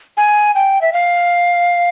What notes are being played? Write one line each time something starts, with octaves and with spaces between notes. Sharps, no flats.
G#5
G5
E5
F5